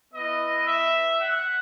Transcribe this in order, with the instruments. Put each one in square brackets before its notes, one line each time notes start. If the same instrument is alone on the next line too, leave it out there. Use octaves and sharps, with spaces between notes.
[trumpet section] B3 E4 D#5
E5
F#5